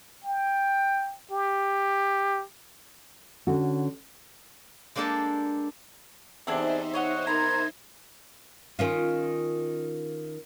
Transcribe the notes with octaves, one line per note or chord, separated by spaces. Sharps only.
G5
G4
D3 C#4 F#4
G#3 A#3 D4 G4 A4
E2 C3 C4 D4 D#4 G#4 C5 E5
C#5 D#5 F#5
B3 A#4 A#5 C6 G#6
D#3 C#4 F4